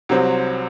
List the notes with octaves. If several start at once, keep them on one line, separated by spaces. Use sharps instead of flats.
C2 C3 F#3 C4